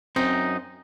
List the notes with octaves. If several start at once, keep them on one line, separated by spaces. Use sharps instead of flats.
F#2 C4 D#4